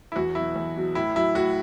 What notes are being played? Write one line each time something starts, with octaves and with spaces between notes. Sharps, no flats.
E4
E2 F#4
B2 F#3 E4
E2
B2 F#3
A2 E4
F#3 E4
A2 F#4